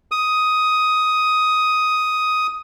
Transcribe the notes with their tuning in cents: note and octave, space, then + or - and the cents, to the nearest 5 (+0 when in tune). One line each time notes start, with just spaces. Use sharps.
D#6 +10